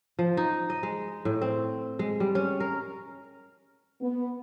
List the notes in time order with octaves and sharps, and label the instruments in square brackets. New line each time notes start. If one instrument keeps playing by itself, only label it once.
[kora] F3
D#4
D#5
G#3
A2
C4
G#3
G3
C#4
A#4
[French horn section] B3